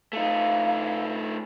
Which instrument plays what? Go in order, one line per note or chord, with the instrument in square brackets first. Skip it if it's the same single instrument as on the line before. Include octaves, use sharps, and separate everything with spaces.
[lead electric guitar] A3 D#4 [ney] F5